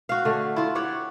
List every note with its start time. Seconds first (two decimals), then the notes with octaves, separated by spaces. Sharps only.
0.09 F#4 F5
0.25 D3 A3
0.56 E4 F4
0.75 G4 C#5 F#5